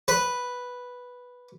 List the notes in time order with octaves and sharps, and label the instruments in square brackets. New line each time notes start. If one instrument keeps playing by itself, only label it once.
[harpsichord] B4